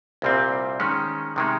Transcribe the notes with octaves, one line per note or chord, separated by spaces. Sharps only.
C2 A#2 G3 C4
D#3 G#3 C#4
C3 D#3 G#3